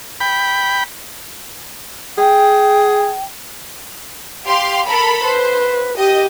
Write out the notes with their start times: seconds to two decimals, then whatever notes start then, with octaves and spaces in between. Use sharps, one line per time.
0.20 G5 B5
2.18 G#4 G5
4.46 G4 F5 C6
4.88 A4 A#4 B5
5.24 B4 C5
5.98 G4 D#5